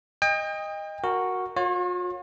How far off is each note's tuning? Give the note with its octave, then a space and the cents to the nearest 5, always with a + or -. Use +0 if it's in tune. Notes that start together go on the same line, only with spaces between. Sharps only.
D#5 +0 G5 +35
F#4 -5 A#4 +0
F4 +45 C#5 -20